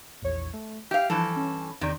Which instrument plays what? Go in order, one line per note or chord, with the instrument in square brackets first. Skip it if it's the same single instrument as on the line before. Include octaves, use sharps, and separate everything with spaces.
[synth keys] A#1 E2 C#5
A3
[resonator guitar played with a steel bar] G4 F5 [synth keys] E5
[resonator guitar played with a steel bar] G2 E3 A4 [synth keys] F3
[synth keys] C#4
[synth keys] E2 D#4 D5 [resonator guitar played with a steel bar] C3 D#3